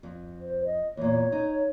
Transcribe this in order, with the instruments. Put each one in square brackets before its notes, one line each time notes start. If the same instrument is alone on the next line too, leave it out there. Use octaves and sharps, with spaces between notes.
[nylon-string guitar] F2
[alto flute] C5
D#5
[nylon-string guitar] E2 A#2 [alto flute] C#5
[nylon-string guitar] D#4